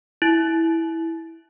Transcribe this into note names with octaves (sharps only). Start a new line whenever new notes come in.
E4